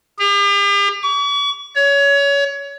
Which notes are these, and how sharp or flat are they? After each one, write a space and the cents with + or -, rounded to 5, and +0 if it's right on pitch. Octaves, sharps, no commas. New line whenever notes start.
G4 +45
C#6 +45
C#5 +25